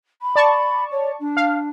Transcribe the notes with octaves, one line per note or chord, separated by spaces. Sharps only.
B5
D5 A5 C#6
C#5
D4
F5